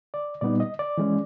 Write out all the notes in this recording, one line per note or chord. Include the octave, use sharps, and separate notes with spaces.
D5
A#2 G3 B3 D#4 D5
D#5
D5
E3 G#3 C#4